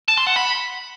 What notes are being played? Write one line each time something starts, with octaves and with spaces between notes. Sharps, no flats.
A5
C6
F#5
B5